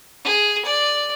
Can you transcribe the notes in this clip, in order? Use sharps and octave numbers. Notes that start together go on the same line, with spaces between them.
G#4
D5